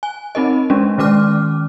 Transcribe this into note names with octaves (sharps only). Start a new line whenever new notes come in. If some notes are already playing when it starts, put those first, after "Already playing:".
G#5
C4 D#4 A#4 D#5
G#3 C#4 D4
D#3 G#3 C#4 D6 F6